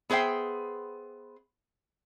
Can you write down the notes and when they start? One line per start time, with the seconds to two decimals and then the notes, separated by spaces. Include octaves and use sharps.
0.10 B3 G#4 C5 E5 G5